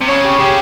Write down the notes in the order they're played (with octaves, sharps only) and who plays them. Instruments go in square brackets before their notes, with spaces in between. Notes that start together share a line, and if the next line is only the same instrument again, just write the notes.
[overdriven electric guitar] C3
[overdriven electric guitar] C#3 [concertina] C#5
[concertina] G4
[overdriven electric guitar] C#3 [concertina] G4